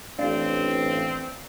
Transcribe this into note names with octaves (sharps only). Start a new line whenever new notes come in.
A1 C4 D4 D5 F5